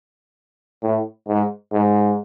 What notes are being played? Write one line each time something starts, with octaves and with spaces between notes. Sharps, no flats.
A2
G#2
G#2